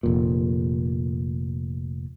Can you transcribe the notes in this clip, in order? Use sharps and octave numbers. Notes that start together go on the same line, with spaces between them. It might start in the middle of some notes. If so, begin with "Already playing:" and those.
F1 A#2